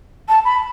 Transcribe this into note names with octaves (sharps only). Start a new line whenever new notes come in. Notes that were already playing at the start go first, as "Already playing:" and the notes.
A5
B5